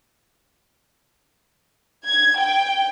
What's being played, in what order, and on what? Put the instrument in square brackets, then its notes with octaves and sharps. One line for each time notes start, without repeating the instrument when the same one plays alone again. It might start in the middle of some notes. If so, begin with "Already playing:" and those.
[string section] G#6
G5